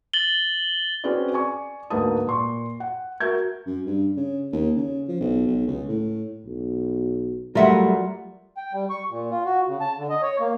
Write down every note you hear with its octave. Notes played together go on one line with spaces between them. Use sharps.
A6 F#7 G7
C4 C#4 F#4 G#4 B4 D5
D5 G#5 C#6
D2 G#2 A#3 B4 A5 D#6
A#2 C6 C#6
F#5
F#4 A#4 E5 G6 G#6
F#2
G2
C#3
D#2
C#3
F3
B1
B1
C#2
A2
B1
F#3 G3 A3 F4 A#4 E5 F#5
G5
G3
C#6
A#2
F4
F#4
C#3
A5
D3
D#5
C#5
A#3